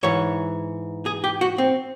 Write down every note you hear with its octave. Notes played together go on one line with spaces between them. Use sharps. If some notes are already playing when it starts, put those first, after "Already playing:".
G#2 E3 C#5
G#4
G4
F#4
C4